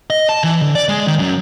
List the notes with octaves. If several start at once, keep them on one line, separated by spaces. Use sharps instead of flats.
D#5
A5
E3
D3
D5
G#3
D#3
F#2